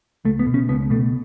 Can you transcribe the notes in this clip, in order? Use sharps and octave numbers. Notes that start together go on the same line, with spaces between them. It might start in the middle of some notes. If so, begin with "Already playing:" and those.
C#2 A3
B3
B2
C#4
C#2 B3
B2 A3